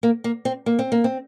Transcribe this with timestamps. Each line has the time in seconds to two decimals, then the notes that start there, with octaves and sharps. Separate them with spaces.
0.03 A#3
0.24 A#3
0.45 C4
0.66 A#3
0.79 C4
0.92 A#3
1.04 C4